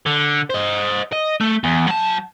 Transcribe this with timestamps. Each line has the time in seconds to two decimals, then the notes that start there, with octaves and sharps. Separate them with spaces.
0.06 D3
0.50 C5 D#5
1.13 D#5
1.41 A3
1.64 E2
1.88 F#3 A5